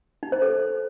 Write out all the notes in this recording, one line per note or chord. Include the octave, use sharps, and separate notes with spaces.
D#4
C5
A4